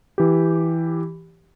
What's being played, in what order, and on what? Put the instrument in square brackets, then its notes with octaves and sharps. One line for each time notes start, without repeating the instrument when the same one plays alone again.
[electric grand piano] E3 G4